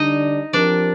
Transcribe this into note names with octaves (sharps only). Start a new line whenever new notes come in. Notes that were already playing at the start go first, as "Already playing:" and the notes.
Already playing: D3 G3 D4 D#4 D#5
F3 C4 D4 G4 A#4 D5